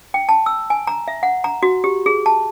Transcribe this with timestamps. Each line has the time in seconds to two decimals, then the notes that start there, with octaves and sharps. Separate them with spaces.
0.14 G5
0.29 A5
0.46 E6
0.70 G#5
0.87 A#5
1.08 E5
1.23 F#5
1.44 A#5
1.63 F#4
1.84 G4
2.06 G#4
2.26 A5